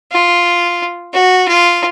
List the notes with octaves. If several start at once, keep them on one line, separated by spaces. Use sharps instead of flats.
F4
F#4
F4